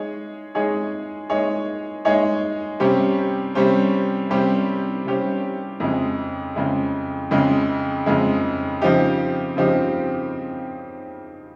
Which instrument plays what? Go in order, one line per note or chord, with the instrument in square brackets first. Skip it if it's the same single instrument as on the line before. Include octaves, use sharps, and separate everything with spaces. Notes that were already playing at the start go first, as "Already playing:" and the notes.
Already playing: [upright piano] G#3 D#4 G#4 C#5
G#3 D#4 G#4 C#5
G#3 D#4 G#4 C#5
G#3 D#4 G#4 C#5
C3 G3 C#4 G4 C5
C3 G3 C#4 G4 C5
C3 G3 C#4 G4 C5
C3 G3 C#4 G4 C5
F2 C#3 G#3
F2 C#3 G#3
F2 C#3 G#3
F2 C#3 G#3
C#3 F3 C4 D#4 G4
C#3 F3 C4 D#4 G4